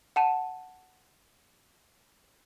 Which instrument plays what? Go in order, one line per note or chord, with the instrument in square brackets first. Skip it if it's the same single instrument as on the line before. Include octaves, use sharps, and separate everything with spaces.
[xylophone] F#5 A5 D#7